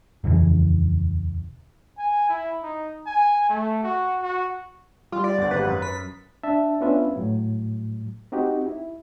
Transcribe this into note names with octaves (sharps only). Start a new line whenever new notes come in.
D#1 F2 C#3 E3
G#5
E4
D#4
G#5
A3
F#4
F#4
G3 F4
D5
G1 F#5 A6
G#1 G4 B4 F#5
F#2
B6
D4 E5 A5
B3 C#4 D4 F4 B4 E5
A2 F#3
C4 D#4 F#4 G4
E4